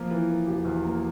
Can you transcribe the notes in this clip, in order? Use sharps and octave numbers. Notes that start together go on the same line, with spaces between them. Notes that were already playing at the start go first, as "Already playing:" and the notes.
Already playing: F3 A#3 F4
E3
A#3
E1 G4
E2
A#3